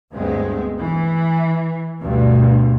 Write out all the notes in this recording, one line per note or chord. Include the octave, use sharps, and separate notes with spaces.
D2 G2 G#3 B3 C4
E3
D2 G2 B2